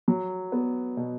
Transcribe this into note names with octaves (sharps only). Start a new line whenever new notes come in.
F#3
B3
B2